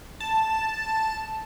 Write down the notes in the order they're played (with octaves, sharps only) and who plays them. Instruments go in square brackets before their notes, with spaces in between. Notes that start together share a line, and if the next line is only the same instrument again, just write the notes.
[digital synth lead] A5